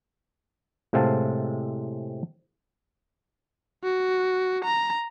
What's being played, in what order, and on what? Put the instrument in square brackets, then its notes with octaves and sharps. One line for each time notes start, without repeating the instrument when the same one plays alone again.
[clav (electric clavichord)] A2 C3 G#3 C4 F5 A5
[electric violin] F#4
A#5